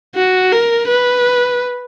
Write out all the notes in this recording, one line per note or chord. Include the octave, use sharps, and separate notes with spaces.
F#4
A#4
B4